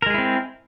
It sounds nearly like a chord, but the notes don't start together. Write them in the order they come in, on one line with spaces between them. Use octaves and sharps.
A#4 G#3 G#4 E4 C4